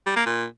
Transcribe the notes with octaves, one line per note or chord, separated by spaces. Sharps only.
G3
A#3
A#2